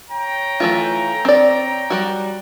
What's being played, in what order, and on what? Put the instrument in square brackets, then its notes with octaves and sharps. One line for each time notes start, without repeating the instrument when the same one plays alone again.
[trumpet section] C#5 G5 A#5
[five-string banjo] E3 A3 F4
C4 D5
G3 F#4